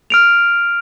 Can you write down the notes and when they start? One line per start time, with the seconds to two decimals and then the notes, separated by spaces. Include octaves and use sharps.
0.10 F6 D7 F7